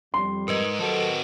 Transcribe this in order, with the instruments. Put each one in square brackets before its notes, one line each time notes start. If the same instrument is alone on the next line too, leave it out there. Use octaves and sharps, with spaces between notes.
[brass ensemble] F2 G3 [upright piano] C6
[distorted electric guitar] G#2 [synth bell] A#4 B4 D#5
[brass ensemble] F#3 G4 A4 [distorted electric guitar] C4 F#4